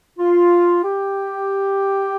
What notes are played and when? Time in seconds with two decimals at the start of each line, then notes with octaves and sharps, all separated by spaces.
0.19 F4
0.83 G4